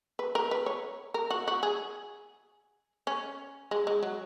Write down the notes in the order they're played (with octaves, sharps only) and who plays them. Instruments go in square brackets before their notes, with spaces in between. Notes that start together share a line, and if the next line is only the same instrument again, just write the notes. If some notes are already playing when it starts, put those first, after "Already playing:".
[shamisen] B4
A#4
B4
C#5
A#4
F#4
F#4
G#4
C#4
G#3
G#3
F#3